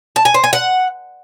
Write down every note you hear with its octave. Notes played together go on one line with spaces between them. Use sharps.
A5
G#5
C5
G#5
F#5